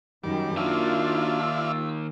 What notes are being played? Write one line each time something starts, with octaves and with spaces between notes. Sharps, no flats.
F#2 D#3 G3 D6
D#3 A#3 D4 F4 F#4 D5 E5 F5
E6